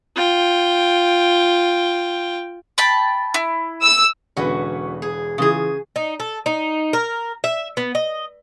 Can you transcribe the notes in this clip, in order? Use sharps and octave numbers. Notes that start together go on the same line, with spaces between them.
F4 G5
G5 A5 B5
E4
E6
E1 D3 C#4 F#4 B4
G#4
C#3 E3 F4 G#4
D#4
A4
D#4
A#4
E5
B3
D#5